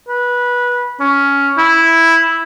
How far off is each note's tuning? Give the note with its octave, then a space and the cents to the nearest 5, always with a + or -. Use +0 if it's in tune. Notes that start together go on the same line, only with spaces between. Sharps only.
B4 -20
C#4 +10
E4 -5